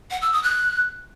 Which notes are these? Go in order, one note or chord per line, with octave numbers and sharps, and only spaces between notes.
F#5
E6
D#6
F#6